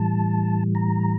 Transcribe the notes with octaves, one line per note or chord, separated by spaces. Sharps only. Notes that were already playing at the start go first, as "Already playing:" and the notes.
Already playing: A2 E3 G3 A5
A#5